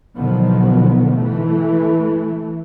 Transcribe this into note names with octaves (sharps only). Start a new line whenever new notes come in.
B2 D3 D#3 F3 F#3 B3
E3 A3